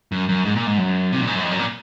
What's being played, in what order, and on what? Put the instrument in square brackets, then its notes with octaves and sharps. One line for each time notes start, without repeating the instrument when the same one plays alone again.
[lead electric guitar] F#2
F#2
G#2
A#2
G#2
F#2
C3
A#2
G#2
F#2
F2
F#2
A#2